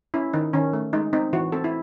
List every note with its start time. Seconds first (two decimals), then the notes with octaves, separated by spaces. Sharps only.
0.14 C#4 E4
0.34 D#3 D#4
0.53 D#3 C#4
0.73 A3
0.93 G#3 D#4
1.13 C4 D#4
1.33 E3 F#4
1.52 C4 A4
1.64 E4